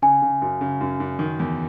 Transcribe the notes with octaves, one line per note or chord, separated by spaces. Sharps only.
C#3 G#5
C#3
F#2
C#3
F#2
F#2
D#3
E2